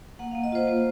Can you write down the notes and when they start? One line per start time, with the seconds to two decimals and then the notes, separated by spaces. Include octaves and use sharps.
0.19 A#3 F#5
0.31 A#3 F5
0.44 D#5
0.52 F4 C5
0.67 A#3 C5